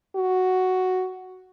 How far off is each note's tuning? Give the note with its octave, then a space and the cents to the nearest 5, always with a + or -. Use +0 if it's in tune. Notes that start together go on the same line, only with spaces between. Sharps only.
F#4 +5